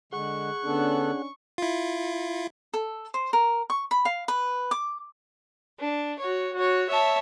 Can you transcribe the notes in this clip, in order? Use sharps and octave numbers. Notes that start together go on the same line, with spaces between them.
D3 G#3 G#4 F#5 C#6 F#6
D3 B3 C#4 D4 A4
E4 F4
A4
C5
A#4
C#6
B5
F5
B4
D6
D4
F#4 C#5
F#4 C#5
C#5 E5 A5